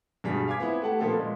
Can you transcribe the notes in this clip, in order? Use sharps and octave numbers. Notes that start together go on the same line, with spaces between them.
G2 B2 G3 G#4 B6
F5 G#5 D6 G#6 B6
B3 C4 E4
A3 G4 F#5 A5
A#2 F3 A#3 B3 F4 A4
A#2 G#3